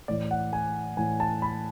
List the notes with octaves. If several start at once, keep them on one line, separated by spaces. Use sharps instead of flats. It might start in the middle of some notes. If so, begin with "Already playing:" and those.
A2 E3 D5
F#5
G#5
A2 E3 G#5
A5
B5